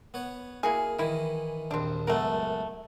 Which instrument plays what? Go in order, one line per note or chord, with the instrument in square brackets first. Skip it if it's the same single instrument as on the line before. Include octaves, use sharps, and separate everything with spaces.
[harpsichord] B3 C#5
[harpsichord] A#3 [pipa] E4 F#4 G#4
[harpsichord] D#3 E3 [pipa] A#3 E4
[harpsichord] A#1 D#2 [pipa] C4 D4
[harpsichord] C#2 F#2 B3 [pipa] A3 A#4